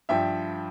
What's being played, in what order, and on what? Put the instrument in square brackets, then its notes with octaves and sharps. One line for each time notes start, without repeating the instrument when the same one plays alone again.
[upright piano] G2 F3 E5 G5